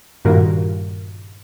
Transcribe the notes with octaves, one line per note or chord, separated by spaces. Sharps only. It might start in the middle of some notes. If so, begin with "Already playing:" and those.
G2 A#2 D#3 A#3 F#4 A#4